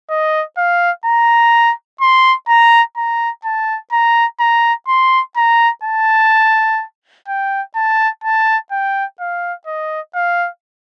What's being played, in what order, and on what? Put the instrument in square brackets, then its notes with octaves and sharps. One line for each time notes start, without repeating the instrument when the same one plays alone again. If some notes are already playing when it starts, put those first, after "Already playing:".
[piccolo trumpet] D#5
F5
A#5
C6
A#5
A#5
A5
A#5
A#5
C6
A#5
A5
G5
A5
A5
G5
F5
D#5
F5